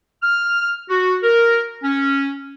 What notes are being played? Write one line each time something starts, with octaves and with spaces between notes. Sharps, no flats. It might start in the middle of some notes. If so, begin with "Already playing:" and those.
F6
F#4
A#4
C#4